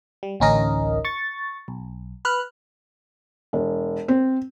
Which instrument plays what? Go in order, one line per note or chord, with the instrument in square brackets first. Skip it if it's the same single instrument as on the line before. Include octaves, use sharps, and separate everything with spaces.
[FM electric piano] G3
A1 D2 C#4 D#4 A#4 D#5
C#6 A6
B1
B4 F6 F#6
[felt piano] E1
C4